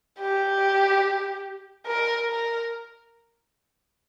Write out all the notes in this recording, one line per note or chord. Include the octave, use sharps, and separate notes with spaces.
G4
A#4
A#4